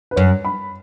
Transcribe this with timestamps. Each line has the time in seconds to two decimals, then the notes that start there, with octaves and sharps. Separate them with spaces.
0.11 B4
0.16 F#2 C#5
0.45 B5